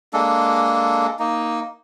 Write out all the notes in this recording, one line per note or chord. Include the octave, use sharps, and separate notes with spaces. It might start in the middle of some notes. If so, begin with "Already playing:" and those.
G#3 A#3 D4 A4
A#3 D#4